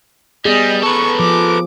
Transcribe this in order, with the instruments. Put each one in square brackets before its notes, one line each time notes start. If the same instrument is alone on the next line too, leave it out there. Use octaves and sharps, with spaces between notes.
[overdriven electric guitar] G3 [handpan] B3 G#4 [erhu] D#5
[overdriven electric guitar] A4 B4 [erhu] C#6
[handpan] F3 [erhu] D6